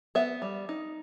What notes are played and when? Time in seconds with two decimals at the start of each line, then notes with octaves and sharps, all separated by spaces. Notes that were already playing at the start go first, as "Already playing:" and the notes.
0.15 B3 E5
0.42 G3
0.69 D#4